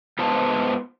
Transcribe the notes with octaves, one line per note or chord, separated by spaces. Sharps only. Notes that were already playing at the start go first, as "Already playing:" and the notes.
G#2 B3 C5 A5